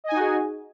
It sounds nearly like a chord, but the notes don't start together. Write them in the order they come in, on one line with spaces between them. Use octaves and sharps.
D#5 G#5 D#4 F#4 G#4